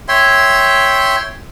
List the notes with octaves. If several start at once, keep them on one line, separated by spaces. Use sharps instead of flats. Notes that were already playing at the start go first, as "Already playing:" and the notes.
C#5 E5 G5 C6